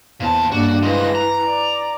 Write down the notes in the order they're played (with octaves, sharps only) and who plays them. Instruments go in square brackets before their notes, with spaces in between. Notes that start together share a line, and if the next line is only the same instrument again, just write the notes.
[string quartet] E2 C5 [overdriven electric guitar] A#2 A5
[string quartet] G2 A#3 D4 [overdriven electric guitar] F#4
[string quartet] E3 A#6 [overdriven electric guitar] F3 G#3
[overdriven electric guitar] A#5
[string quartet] D5